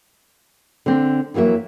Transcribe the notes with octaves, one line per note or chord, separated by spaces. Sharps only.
D3 C4
F2 E3 F#3 A#3 E5